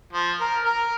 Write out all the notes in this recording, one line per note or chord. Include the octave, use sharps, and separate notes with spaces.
F3
A#4
A#4